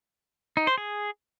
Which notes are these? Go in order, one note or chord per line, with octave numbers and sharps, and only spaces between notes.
D#4
C5
G#4